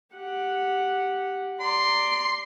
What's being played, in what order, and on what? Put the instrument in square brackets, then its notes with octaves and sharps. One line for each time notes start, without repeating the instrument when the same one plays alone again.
[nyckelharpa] G4 F#5
[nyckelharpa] D5 A#5 [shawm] C6